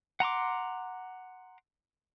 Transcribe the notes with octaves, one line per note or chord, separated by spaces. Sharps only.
F#5 A#5 C6 D6